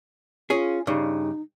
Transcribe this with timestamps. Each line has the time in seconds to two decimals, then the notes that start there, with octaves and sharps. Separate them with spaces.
0.50 C#4 F4 G#4
0.87 G2 C#3 D#4